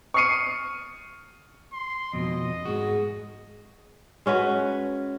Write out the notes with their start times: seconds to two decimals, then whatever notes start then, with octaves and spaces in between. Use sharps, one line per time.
0.14 C#6 D#6 F6 C7 C#7 D#7
1.73 C6
2.13 F2 B2 D#5
2.66 G#2 F#4 G#4
4.26 G#3 C#4 F#4 B4